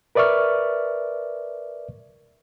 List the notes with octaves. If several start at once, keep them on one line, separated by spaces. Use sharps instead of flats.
A#4 B4 D5 E5 C#6 F6